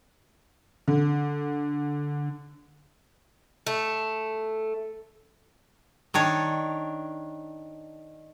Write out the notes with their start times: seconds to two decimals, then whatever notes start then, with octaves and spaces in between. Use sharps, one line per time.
0.88 D3
3.67 A3
6.14 D#3 D4 C#5